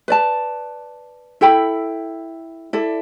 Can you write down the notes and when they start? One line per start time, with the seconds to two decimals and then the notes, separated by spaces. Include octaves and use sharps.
0.08 B4 D5 A5
1.41 E4 A4 G5 B5
2.73 E4 A4 D5